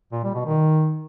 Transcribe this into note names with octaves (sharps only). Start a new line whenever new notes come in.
A#2
G3
B2
D#3